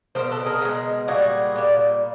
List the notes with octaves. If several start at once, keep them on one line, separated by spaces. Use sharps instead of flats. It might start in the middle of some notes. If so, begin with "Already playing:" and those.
G#3 A#4 C5
B2
A4 B4
G#4 A#4
B2 G#3
A#2 G3 F#4 G#4
A#2 G3